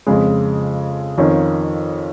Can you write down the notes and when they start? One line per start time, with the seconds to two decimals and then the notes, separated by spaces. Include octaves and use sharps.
0.07 F2 C#3 G#3
1.18 F2 D#3 C#4 F4